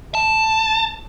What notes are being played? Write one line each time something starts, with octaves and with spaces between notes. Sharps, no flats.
A5